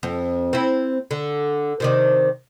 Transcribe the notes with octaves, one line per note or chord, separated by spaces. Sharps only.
F2
C4 E4
D3
C3 D#3 D4